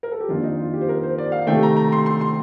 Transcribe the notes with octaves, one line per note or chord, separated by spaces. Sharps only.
A#4
A4
G4
F2 D#3 A#3 D4 F4
D#4
F4
G4
C5
A#4
C5
D5
F5
C3 D#3 A3 G5
A#5
A#5
C6
C6
C6